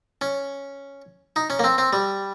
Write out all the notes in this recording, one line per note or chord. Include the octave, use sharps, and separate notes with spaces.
C#4
D#4
C#4
A#3
C4
C4
G3